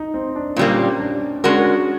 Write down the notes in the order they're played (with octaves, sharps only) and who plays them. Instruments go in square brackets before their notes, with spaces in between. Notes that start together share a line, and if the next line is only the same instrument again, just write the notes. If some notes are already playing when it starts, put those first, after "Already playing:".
Already playing: [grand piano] D#4
C4
D4
[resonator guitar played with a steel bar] A#2 G3 A#3 [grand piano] C#4
[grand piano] D4
[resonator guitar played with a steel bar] G#3 C#4 F#4 A#4 [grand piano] D4